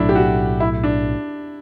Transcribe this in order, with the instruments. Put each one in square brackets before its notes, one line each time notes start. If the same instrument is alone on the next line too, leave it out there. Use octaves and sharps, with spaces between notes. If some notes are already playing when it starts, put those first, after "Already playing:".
Already playing: [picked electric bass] B1 A2 F#3 A3 [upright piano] D4 E4
[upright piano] G4
F#4
E4
D4